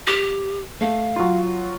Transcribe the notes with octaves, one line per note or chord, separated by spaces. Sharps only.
G4
A3 F5
F#3 F4